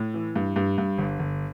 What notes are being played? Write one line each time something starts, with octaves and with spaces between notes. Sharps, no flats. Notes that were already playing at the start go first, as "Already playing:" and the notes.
Already playing: A2
E3
G2
G2
G2
G1
G1